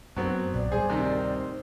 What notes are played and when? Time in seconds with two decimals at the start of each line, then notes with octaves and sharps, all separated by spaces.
0.16 F#2 F#3 B3 C4 C5
0.53 B1 A#2 D5
0.72 D2 A2 G3 G#4 C5
0.90 C3 D#3